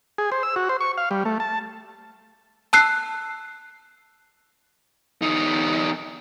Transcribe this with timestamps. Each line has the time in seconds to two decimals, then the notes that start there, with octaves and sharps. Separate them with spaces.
0.18 G#4
0.32 C5
0.43 E6
0.56 F#4
0.69 C5
0.81 C#6
0.98 F5
1.11 G3
1.25 A3
1.40 A5
2.73 A5 E6 F#6 C7
5.22 E2 D#4